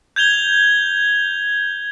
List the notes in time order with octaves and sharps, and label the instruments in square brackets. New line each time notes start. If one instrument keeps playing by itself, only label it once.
[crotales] G6 G#6 F7 G7